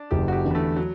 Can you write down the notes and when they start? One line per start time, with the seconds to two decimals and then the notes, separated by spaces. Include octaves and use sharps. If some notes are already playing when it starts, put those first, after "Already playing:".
Already playing: D4
0.11 F#1 G4
0.28 F#4
0.32 G4
0.44 E2 D3
0.51 B3
0.55 A3
0.76 F#3